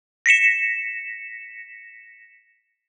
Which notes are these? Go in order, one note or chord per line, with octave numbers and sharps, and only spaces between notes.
A#6 B6 C#7 E7